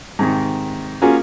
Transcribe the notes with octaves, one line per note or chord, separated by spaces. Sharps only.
G#2 C3 D#3
A#3 C#4 F4 F#4 G#4